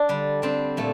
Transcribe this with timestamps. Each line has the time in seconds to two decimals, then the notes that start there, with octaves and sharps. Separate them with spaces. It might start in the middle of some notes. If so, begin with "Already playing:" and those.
Already playing: D4
0.09 D3 G3
0.42 D3 G3 C4
0.77 A#2 A3